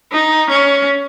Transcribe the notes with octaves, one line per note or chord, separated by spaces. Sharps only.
D#4
C#4